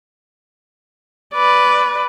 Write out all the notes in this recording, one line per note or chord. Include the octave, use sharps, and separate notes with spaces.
B4 D5